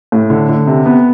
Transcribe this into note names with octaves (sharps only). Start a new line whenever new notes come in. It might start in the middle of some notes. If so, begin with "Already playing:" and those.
A2
D3
D3
C3
B3